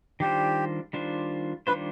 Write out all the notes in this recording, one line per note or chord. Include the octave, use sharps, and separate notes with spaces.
D#3 G3 D4 F4 G4 C5
D#3 G3 D4 F4 C5
D#3 G3 D4 F4 B4 C5